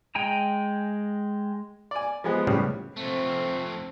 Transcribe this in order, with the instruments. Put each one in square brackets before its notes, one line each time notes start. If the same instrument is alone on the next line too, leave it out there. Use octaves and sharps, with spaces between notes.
[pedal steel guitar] G#3 G5 G#5 A#5
[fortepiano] D5 G#5
F3 G#3 B3
[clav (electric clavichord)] A2 C#3 G3 [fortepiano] B3
[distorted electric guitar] F2 A3 [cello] C4